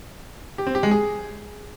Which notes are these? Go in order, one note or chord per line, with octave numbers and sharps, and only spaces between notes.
G4
C4
G4
G#3
G#4